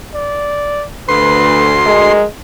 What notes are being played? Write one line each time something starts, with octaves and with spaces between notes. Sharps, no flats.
D5
D2 B4 C6
G#3 A#4